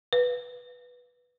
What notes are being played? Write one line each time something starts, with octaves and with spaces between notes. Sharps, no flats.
B4